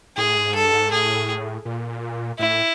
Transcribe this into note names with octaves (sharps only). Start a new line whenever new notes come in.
A2 G#4
G#2
G2 A4
G#2
A2 G#4
A#2
A2 E4